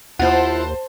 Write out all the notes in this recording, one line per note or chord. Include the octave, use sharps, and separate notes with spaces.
D#2 E4 F4 C5 F#5 A5